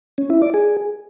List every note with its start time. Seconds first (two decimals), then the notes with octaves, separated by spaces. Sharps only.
0.18 C#4
0.30 E4
0.42 D5
0.54 G#4